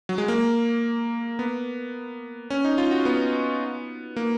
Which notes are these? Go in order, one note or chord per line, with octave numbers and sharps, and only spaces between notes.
F#3
G#3
A#3
B3
C#4
D#4
F4
F#4
B3
A#3